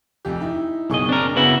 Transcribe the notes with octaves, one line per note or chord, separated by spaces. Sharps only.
F1 F2 G4
D#4 E4
F#1 B1 G#4 D#5 C#6
C4 D4 A#4
C#3 B3 E4 F#4